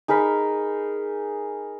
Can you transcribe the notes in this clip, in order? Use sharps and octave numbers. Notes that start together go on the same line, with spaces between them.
D#4 G#4 A#4 B5